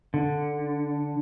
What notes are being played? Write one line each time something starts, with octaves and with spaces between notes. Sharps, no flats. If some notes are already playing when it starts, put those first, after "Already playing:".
D3